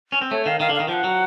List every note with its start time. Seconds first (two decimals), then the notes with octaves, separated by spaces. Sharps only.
0.12 C#4
0.21 C4
0.31 A3 C#5
0.45 D#3 F5
0.60 D#3 F5
0.70 D3
0.75 D#3 F5
0.88 F3 G5
0.93 F#5
1.04 F#3